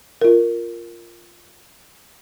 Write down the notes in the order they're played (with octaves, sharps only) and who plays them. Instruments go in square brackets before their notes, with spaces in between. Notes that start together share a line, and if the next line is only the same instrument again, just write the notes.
[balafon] F4 A#4